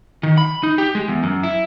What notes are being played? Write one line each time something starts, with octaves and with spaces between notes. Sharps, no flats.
D#3
B5
D#4
G4
G#3
E2
F#2
E4